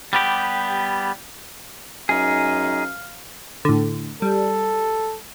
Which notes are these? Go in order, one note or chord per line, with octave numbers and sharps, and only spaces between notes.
G3 B3 G4
F#2 D#4 G#4 F5
A2 D3
G3 A4